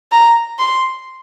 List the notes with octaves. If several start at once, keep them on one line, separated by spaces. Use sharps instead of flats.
A#5
C6